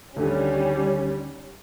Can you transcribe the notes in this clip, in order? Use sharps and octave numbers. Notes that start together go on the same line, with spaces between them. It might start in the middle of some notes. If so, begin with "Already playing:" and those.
D2 D3 D#3 G3 C#4